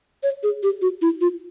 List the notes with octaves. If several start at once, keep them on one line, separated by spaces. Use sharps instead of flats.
C#5
G#4
G4
F#4
E4
F4